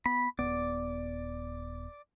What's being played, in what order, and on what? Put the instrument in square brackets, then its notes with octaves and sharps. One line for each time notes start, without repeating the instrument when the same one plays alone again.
[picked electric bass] B3 [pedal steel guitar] B5
[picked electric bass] D#1 F#2 B3 [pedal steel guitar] D5